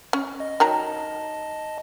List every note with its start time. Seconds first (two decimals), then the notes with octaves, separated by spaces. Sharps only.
0.13 C#4
0.40 D#5
0.60 D#3 F#3 D#5 A5 A#5